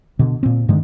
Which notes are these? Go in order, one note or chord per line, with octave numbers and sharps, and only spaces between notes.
B2 D3
A#2 C4
G2 D3 D#3 G#3